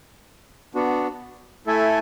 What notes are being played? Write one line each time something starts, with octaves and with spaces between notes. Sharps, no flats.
B3 D4 F#4
A3 E4 A4 E5 G#5